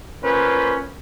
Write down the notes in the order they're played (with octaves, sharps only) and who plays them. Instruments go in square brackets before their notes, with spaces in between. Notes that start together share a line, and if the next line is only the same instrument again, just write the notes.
[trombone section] A#2 C#4 B4 C5